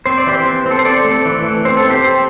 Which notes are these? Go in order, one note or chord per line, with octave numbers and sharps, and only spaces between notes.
C4 C5
D5
E3 G4 C5
C4
C4
A4
C5
C4 A4 D5
A3
E3
E3
C4 C5
A4
C4
G4 C5
C4